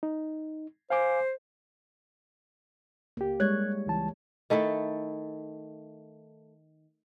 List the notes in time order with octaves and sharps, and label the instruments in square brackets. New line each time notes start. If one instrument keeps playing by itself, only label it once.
[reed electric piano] D#4
[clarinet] C5 [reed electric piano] F5 G#5 D6
[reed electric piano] C#2 G4 [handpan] A#3
[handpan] G3 G#3 C#5 [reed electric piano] F#6 G#6
[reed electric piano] C#2 E3 A5
[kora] D#3 A3 E4 A4